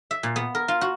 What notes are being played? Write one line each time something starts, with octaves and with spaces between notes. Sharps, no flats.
E5
A#2
B3
A#4
F4
F#4